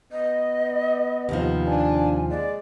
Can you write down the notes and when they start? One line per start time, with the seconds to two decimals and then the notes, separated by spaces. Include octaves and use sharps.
0.12 B3 D#5
1.29 D#2 C3 F3
1.67 D4 G#5
2.30 G#3 D5